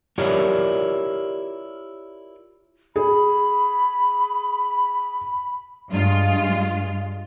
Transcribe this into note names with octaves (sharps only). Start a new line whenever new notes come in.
E4 F4 G4 A#4 C#5 D5
G#4 B5
G2 G#3 F4